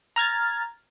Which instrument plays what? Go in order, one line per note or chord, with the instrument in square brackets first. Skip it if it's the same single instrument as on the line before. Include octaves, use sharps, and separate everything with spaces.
[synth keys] A#5 F6 G#6 A6